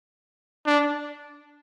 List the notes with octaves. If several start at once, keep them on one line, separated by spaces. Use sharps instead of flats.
D4